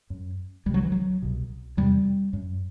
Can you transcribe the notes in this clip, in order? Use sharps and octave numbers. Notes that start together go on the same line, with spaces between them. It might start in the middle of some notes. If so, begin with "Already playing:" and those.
F#2
C2 C3 G3
F#3
E3
F#3
C2 B2
E2 C3 G3
F#2